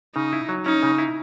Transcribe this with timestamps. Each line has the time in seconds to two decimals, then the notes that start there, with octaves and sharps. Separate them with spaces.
0.15 C#3 D#4
0.33 E4
0.49 F#3
0.65 C#4 D#4
0.83 C#3
0.98 E4